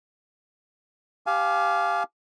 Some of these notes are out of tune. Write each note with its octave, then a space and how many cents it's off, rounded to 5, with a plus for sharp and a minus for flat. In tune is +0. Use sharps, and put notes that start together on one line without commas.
G4 +0 F5 +0 G#5 +35